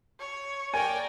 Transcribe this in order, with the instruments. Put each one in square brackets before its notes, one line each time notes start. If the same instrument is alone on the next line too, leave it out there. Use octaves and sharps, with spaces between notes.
[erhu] C#5
[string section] A#4 D5 G5 [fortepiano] G#5